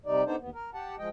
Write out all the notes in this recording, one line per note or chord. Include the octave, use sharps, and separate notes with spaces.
C3 G3 D#4 D5
B3 D4 D#4 A4 C5
D#2 B3
A#4
G4 F#5 A5
F3 G#3 D#5 G5